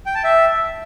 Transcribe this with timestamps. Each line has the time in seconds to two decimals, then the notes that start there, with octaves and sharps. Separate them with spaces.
0.06 G5
0.15 A5
0.24 E5